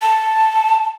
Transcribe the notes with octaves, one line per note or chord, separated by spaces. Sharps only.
A5